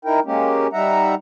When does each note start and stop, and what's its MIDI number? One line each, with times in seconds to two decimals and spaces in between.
0.05 0.20 63
0.05 0.20 64
0.05 0.20 70
0.05 0.20 79
0.25 0.67 56
0.25 0.67 58
0.25 0.67 61
0.25 0.67 67
0.73 1.15 55
0.73 1.15 63
0.73 1.15 76
0.73 1.15 78
0.73 1.15 82